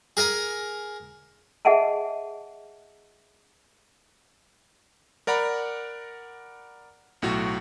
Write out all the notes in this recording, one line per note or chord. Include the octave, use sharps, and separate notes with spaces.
G#4 A#4 G#5 A#5
G#4 D#5 E5 F#5 G#5 A5
A#4 D5 F#5 A#5 B5
B1 A2 F#4